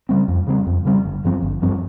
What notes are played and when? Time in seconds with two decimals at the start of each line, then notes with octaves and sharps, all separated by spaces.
0.09 C#3 G3 C4
0.28 F2
0.47 C#3 G3 C4
0.67 F2
0.85 C#3 G3 C4
1.05 G1
1.25 G2 F3 C4
1.42 G1
1.62 G2 F3 C4